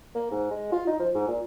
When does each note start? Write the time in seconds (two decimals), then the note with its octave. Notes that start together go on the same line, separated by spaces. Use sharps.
0.15 A#3
0.31 G#2
0.51 G#3
0.72 F4
0.87 D#4
0.99 F3
1.14 G#2
1.28 A#2